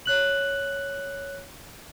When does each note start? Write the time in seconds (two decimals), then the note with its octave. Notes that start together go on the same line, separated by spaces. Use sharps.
0.06 C#5 F#6 F#7